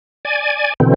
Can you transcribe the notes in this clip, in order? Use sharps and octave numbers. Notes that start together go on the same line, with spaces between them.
D5 G#5
B2 D3 E3 C4